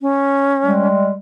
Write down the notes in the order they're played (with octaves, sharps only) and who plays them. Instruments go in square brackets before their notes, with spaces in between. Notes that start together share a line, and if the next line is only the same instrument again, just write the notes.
[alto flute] C#4
[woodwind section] G3 G#3